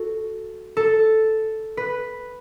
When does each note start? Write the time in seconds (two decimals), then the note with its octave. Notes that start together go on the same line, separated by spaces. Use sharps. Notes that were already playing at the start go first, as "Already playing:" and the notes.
Already playing: F#4 A4
0.77 A4
1.77 B4